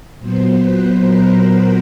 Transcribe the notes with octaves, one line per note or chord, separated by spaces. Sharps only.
A#2 F#3 B3 C5
B4
A#4